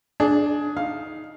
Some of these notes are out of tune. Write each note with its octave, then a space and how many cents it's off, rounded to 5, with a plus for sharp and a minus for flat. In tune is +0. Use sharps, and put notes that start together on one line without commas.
D4 +0 G#4 +15
D#4 +0 F5 +5